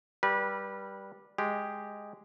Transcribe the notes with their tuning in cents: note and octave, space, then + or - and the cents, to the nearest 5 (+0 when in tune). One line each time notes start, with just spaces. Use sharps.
G3 +0 B4 -30
G#3 -5 G4 +0